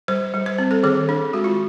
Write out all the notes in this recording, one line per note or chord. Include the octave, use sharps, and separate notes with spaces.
G3 C5
G3
C5
C4
A4
D#3 G#4
D4
G#3 F#4
F4